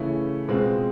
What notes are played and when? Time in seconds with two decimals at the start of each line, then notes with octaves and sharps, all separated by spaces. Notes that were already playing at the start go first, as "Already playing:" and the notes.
Already playing: C#3 E3 A3 C#4 E4
0.48 B2 G#3 C4 F4